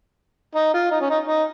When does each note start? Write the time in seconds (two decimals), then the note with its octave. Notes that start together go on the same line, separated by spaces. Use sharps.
0.55 D#4
0.74 F4
0.91 D#4
1.01 C#4
1.10 D#4
1.27 D#4